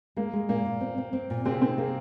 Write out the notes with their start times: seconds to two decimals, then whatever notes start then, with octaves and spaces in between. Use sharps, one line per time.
0.16 G#3 A#3
0.33 G#3
0.49 A#2 A#3
0.65 A#2
0.81 C4
0.98 C4
1.13 C4
1.30 A#2
1.45 C3 C4 G#4
1.61 C3 C4 D#4
1.78 A#3 G#4